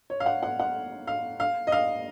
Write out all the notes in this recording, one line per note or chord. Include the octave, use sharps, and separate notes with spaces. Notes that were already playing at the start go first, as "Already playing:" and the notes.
C#5
F5
F#5
F#5
F#5
F5
F5
D#5
F5